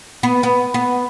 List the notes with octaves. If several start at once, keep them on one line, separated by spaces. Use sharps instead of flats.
B3
B3
B3